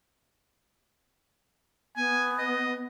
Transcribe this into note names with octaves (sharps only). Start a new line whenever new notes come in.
B3 G#5
D#5